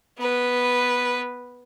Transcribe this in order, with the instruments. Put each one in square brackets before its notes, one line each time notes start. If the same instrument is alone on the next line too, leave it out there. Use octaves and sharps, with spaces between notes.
[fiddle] B3 B4